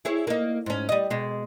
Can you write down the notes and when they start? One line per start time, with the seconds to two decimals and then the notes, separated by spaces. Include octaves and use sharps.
0.05 E4 G#4 C#5
0.27 A#3 D#4
0.66 G#2 C#4
0.89 G3 D#5
1.10 B2 G#3